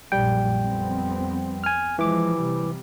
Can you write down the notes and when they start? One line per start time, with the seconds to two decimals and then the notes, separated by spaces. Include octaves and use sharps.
0.12 A#1 F#2 A#2 G3 G5
0.61 F2 B3 C4
1.64 G#5 F6
1.99 E3 F3 G#3 D6
2.37 C3 G3